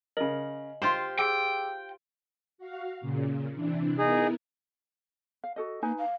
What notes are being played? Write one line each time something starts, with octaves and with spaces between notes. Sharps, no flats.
C#3 A#4 D#5 F#7
F4 G4 C5 C6
G#4 G5 D6 E6
F#4 F5
A#2 C#3
C3 E3 D4
B3 D#4 E4 G#4 A#4
F5
F#4 A4 D#5
A#3 D#4 B4 G#5
F5